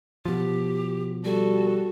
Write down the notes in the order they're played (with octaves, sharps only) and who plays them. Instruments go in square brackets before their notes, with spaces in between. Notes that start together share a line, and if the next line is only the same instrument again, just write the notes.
[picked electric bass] B2 F3 [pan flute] G4
[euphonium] G3 [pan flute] F#4 [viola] A4